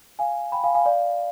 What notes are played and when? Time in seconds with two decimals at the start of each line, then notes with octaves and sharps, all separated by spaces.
0.19 F5 G#5
0.52 G5 B5
0.64 F5 G#5
0.75 F5 G#5
0.85 D5 F5